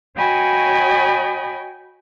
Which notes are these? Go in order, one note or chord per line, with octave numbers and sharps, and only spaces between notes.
F#4 C#5 D#5 G5 G#5 B5